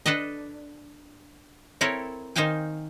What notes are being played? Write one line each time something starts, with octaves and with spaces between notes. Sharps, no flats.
D4 A4 B4 D5 D#5
C4 E4 A4 A#4 C#5
D#3 D#4 C5 F5 G5 G#5